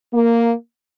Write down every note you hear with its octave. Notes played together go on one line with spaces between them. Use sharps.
A#3